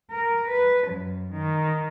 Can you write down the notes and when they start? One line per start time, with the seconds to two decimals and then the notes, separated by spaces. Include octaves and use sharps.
0.10 A#4
0.48 B4
0.86 F#2
1.32 D#3